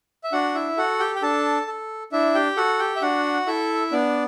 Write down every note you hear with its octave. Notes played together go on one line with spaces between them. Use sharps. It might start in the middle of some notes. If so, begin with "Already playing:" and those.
E5
D4 F#4 F#5
E4 E5
F#4 A4 F#5
G4 G5
G5
D4 A4 A5
A4
D4 E4 E5
G4 G5
F#4 A4 F#5
G4 G5
E5
D4 F#4 F#5
E4 A4 E5
B3 D4 D5